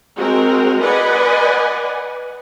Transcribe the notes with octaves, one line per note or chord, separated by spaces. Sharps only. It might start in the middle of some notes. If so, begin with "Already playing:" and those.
G#3 C4 F#4 A#4
B4 D5 D#5 F#5 G#5